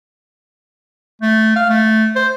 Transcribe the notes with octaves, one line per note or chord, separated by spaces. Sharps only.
A3
F5
A3
C5